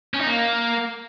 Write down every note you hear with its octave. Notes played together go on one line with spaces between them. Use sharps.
C#4
D#4
A#3